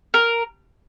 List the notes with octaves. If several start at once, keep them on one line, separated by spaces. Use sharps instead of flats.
A#4